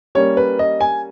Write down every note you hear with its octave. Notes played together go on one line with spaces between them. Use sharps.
G3 A#3 C#4 C#5
B4
D#5
G#5